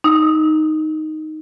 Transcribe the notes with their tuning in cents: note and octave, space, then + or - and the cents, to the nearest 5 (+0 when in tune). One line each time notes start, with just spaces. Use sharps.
D#4 +0 E6 -40